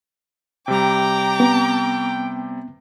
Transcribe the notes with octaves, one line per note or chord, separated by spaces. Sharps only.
C3 G3 G5 A#5 D6
B3 C4